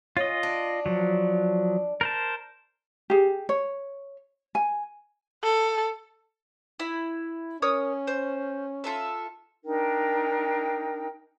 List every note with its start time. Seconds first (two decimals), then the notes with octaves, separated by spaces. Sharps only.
0.17 C#4 F4 D#5
0.43 D4
0.86 F3 F#3
2.01 A#4 C5 A5
3.10 G4 G#4
3.49 C#5
4.55 G#5
5.43 A4
6.79 E4 B5
7.62 C#4 A#4 C#5 D#6
8.07 C5
8.84 F4 A4 E5
9.65 D4 D#4 A#4 G5